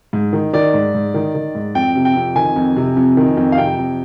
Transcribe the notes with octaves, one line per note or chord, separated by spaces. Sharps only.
G#2
D#3
D#3 D5
G#2
G#2
D#3
D#3
G#2
F2 G5
C3
G5
F2
D#3 G#5
F2
C3
F2
D#3
F2
F5
C3 G5
F2